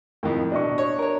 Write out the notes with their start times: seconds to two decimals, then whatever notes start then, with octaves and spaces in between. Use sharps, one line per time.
0.23 F2 A2 D#3
0.52 B2 D4 D#5 C#6
0.78 C#5
0.99 A#4 C#5